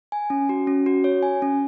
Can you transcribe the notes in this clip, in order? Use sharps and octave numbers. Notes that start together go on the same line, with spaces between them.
G#5
C#4
F#4
C#4
F#4
C#5
G#5
C#4